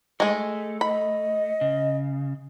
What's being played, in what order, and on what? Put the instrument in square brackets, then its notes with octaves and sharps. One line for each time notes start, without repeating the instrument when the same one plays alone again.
[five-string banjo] G#3 G#4 [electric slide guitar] A3
[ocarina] D#5 [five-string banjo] B5
[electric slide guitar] C#3